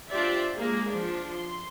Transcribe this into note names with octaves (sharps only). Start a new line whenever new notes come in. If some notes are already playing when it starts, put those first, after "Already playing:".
D4 F4 G4 C5 D5 E5
G#3 A#3 G#4
F3 D4
C6